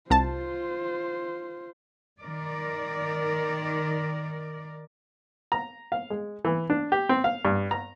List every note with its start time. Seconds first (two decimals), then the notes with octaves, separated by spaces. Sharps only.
0.10 C2 F4 C5 A5
2.20 D#3 A#4 D5
5.52 A#5
5.92 F5
6.10 G#3
6.45 E3
6.70 D4
6.92 G4
7.09 C4
7.24 F5
7.45 G2
7.71 A#5